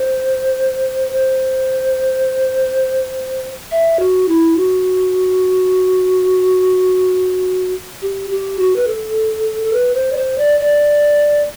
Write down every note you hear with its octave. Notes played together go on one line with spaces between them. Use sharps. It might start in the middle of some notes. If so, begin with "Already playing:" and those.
Already playing: C5
C5
E5
F#4
E4
F#4
G4
G4
F#4
B4
A4
A4
B4
C5
D5
C5
D5
D5